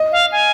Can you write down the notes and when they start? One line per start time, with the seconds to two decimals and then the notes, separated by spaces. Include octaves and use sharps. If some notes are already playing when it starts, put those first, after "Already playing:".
Already playing: D#5
0.12 F5
0.32 G#5